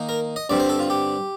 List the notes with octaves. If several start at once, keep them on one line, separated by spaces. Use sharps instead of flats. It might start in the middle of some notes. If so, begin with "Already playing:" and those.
Already playing: D#3 A#3 D#4
A#4
D#5
G2 D3 G3 C4 D5
C5
A4
F4
G4